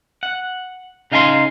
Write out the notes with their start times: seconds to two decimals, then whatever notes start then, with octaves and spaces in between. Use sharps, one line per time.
0.23 F#5
1.12 C#3 D#4 F5 G#5 A#5 C6